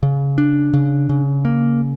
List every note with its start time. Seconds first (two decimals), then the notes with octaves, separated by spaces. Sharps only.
0.03 C#3
0.38 D4
0.73 C#3
1.09 C#3
1.45 A#3